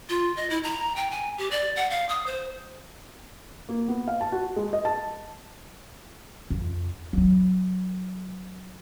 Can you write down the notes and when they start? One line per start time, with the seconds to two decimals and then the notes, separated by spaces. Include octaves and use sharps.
0.09 F4
0.37 D#5
0.50 E4
0.63 A#5
0.96 G5
1.11 G#5
1.38 G4
1.51 D5
1.76 F#5
1.90 F5
2.09 D#6
2.27 C5
3.69 A#3
3.88 B3
4.08 F5
4.21 A5
4.32 F#4
4.56 G#3
4.73 D#5
4.85 A5
6.50 F2 F4
7.13 F#3 E4